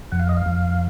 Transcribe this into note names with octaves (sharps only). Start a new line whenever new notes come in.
F2 F#5
F5
D#5
F5
F2